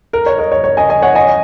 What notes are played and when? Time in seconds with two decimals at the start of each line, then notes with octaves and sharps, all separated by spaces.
0.13 A#4
0.26 C#5
0.38 A#4 D#5
0.52 C#5
0.64 C#5
0.77 D#5 G#5
0.90 D#5 G#5
1.02 C#5 F#5
1.15 D#5 G#5